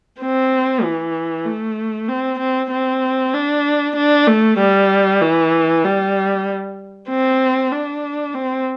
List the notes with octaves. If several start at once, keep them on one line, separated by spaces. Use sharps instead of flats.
C4
E3
A3
C4
C4
C4
D4
D4
A3
G3
E3
G3
C4
D4
C4